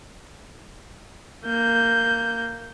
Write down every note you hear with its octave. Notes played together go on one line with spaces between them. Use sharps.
A#3 G6